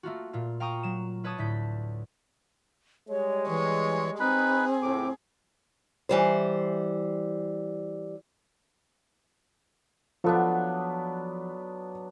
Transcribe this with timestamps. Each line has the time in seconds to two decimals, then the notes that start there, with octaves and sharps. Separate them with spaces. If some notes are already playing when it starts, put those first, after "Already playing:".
0.03 A3 A#3 F4 F#4
0.33 A#2 F4
0.60 F5 G5 A#5 C#6 D#6
0.83 F#3 E7
1.24 F4 B4 C#5 A5 C#6 D#6
1.38 D2 A2 G6 B6
3.09 G3 G#3 C#5
3.49 E3 C#5
4.20 C4 D#4 G#4 B4 B5
4.82 C#2 A2 D6
6.09 E3 G3 C5
10.24 F3 F#3 B3 D4 F4 A4